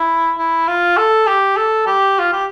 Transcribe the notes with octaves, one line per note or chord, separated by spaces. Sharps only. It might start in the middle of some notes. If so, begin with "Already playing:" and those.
Already playing: E4
E4
F4
A4
G4
A4
G4
F4
G4